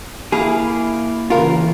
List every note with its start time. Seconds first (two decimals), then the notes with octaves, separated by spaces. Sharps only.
0.32 A#3 E4 G#4 F5
1.30 C#3 E3 F4 A#4